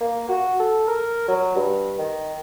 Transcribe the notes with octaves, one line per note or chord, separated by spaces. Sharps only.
A#3
F#4
A4
A#4
F#3
G2
D#3